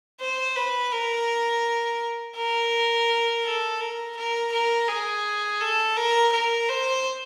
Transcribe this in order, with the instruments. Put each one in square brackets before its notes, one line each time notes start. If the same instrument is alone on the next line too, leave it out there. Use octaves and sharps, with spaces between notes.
[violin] C5
B4
A#4
A#4
A4
A#4
A#4
A#4
G#4
A4
A#4
A#4
C5